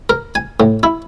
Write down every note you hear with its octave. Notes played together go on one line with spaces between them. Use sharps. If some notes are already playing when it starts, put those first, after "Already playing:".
A#4
G#5
A2
E4